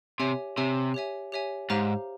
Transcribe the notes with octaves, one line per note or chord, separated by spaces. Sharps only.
C3 G4 C#5 E5 G#5
C3 G4 C#5 E5 G#5
G4 C#5 E5 G#5
G4 C#5 E5 G#5
G#2 G4 C5 F5 A#5 F6